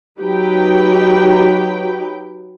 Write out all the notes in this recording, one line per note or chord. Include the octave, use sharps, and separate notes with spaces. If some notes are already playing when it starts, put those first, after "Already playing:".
F#3 D#4 G4 B4 G5